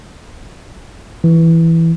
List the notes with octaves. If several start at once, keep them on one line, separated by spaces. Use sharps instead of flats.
E3